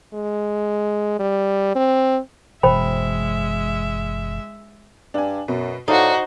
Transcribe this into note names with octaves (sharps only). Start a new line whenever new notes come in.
G#3
G3
C4
F#1 B2 E3 G#3 C5 E5 G5 B5
G2 D4 G#5
F#2 B2
A2 D#4 F#4 A4 C5 D5 F5